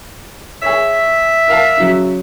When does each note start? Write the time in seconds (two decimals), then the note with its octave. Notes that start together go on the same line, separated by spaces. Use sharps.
0.62 G#4 C#5 E5
1.48 A#4 F5 A5
1.77 C#3 F#3